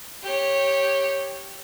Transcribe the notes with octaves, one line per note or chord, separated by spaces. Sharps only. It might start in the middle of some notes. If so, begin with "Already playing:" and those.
G4 C#5